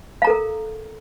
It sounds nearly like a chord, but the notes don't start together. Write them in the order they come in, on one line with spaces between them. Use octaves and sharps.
F5 A#5 A4 A#4